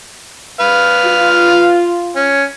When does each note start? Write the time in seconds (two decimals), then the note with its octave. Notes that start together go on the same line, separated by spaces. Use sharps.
0.60 B4 F5
1.05 F4
2.16 C#4